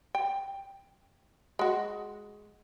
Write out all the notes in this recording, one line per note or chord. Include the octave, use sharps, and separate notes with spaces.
G5
G#3 F#4